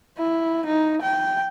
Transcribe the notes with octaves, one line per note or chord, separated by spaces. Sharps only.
E4
D#4
G5